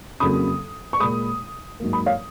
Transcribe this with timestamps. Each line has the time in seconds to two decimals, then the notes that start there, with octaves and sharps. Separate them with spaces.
0.20 F2 C#3 F#3 A#3 B5 D#6
0.93 C#6
1.00 A#2 G#3 B5 D#6
1.80 G#2 F#3 A#3
1.93 B5 D#6
2.06 C#5 F5